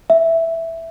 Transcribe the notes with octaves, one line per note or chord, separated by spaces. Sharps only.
E5